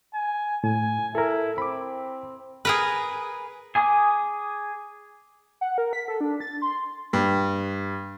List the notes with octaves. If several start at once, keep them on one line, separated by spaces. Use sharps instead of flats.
G#5
A2 G#5
E4 A4 A#4
C4 B5 D6
G#4 A#4 B4
G#4 G#5 D6 D#6
F#5
A#4
B6
A4
D4
A6
C6
G2